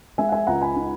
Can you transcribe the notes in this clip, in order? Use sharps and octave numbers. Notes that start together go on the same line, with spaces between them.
G#3 E5 G#5
F#5
E5 G#5
C#2 F#5 A#5
G#5 B5
D#4